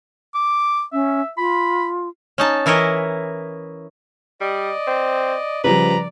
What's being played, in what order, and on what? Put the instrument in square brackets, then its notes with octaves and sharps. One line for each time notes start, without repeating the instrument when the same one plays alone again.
[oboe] D6
[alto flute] C#4 [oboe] E5
[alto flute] F4 [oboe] B5
[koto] C#4 D#4 A5
E3 E4 A#4 C#5 D#5
[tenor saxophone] G3 [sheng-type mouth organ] D5 D#5
[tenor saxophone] C4
[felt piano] C#3 F3 G3 [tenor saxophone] B4 [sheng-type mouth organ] D5 [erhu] A#5